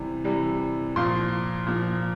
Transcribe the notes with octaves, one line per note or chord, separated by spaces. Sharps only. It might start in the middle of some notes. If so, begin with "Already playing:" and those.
Already playing: C3 E3 G3
C3 E3 G3
A#2 F3 C6
A#2 F3